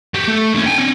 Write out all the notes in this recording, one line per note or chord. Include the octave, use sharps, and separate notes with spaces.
F#4 G4
A3
D#2 C#4
G5 G#5
C4 C#4